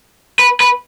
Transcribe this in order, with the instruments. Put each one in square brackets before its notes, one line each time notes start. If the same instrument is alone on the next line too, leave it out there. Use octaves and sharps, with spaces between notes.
[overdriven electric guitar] B4
B4